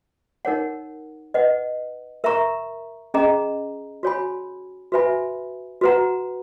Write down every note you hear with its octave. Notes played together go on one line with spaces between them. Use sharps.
D#4 A#4 C#5 F#5
B4 D#5 F#5
A#4 E5 A#5 C#6
C#4 G#4 D#5 A#5
F#4 C#5 G#5 B5
F#4 B4 E5 G#5 B5
F#4 B4 F#5 A#5